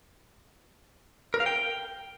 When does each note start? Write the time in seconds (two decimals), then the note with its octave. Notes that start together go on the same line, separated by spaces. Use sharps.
1.34 A#4
1.40 F5
1.46 G5